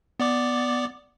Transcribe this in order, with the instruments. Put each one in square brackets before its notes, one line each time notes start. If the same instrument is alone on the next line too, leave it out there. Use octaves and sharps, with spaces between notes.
[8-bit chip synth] B3 D5 D6